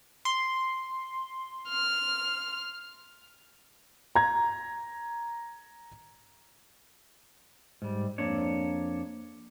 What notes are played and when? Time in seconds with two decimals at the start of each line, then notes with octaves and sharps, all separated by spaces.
0.25 C6
1.69 F6
4.15 A#5 G#6
7.82 G#2 G3
8.18 F2 A#3 D4 C#5